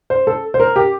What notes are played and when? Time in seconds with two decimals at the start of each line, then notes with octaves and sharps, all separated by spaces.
0.10 C5
0.27 A4
0.54 C5
0.60 A#4
0.76 G4